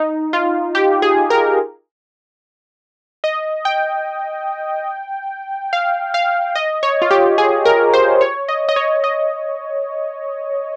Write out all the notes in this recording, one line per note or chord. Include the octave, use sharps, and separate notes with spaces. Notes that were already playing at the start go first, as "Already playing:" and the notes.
Already playing: D#4
F4
G4
G#4
A#4
D#5
G5
F5
F5
D#5
C#5
F4
G4
G#4
A#4
C5
C#5
D#5
D#5
C#5
D#5